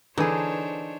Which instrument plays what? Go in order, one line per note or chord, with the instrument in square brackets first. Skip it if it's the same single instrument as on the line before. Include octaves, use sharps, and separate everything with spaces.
[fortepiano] D3 [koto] E3 [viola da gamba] D4 C5 C#5 [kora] D#4 G#4